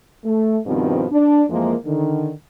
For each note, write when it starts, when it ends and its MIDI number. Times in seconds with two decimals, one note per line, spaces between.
0.25 0.58 57
0.66 1.05 43
0.66 1.05 47
0.66 1.05 51
0.66 1.05 53
0.66 1.05 59
0.66 1.05 60
1.12 1.44 62
1.50 1.74 41
1.50 1.74 52
1.50 1.74 53
1.50 1.74 56
1.50 1.74 58
1.85 2.31 50
1.85 2.31 51